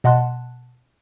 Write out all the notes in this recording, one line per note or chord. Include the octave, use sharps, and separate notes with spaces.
B2 D#5 F#5 A5 C6 F#6